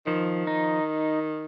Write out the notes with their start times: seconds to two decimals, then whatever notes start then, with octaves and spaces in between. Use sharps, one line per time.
0.07 D#3 F3
0.47 D#4